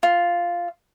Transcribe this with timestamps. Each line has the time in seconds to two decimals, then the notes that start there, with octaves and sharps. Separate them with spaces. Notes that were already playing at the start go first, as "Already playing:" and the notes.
0.03 F4